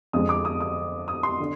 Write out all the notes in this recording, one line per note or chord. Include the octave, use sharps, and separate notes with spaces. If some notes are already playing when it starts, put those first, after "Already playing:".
F2 D3 G#3 D#6
D6
D#6
D#6
D#6
C6
D3